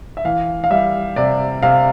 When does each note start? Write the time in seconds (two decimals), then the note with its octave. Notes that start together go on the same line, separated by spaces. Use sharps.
0.17 E5
0.25 E3 F5
0.64 F5
0.71 G3 E5
1.16 C3 D5
1.63 C3 F5